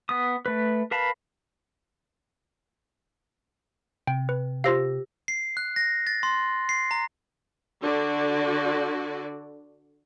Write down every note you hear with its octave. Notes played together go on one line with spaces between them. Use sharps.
B3 D#6
A3 B4
A#4 B4 F5 A5 B5
C3 G5
B4
F4 G4 C5 F5 E6 A#6
C7
F#6
A#6
A6
C6
C7
A#5
D3 F#4 D5